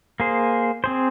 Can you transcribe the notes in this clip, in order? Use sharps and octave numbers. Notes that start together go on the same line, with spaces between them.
A#3 G#4 C5
C4 G#4 C5